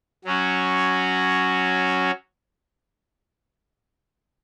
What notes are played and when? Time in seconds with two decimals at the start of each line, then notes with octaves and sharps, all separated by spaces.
0.25 F#3 C#4 F#4